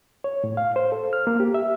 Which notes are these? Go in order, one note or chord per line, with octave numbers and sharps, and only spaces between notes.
C#5
A2
F5
C5
A4
F6
A#3
G4
E5